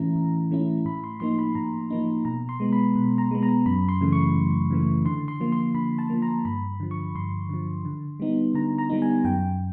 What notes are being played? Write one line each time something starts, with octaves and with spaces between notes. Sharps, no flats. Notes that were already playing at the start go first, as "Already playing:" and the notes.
Already playing: A2 E3 A3 C#4 E4 A#5
A2
E3 A3 C#4 E4
A2 B5
C6
F3 A#3 D#4 C6
B5
A2 A#5
F3 A#3 D#4
B2 A#5
C6
G#3 B3
B5
B2
A#5
G#3 B3
A#5
F#2 B5
C6
C#3 E3 A3
C#6
F#2
C#3 E3 A3
D3 C6
C6
F3 A#3
C6
D3 B5
A5
F3 A#3
A#5
G2 B5
D3 F3
C#6
G2 C6
D3 F3
D3
G3 B3 D#4
D3 A#5
A#5
G3 B3 D#4
G#5
F#2 G5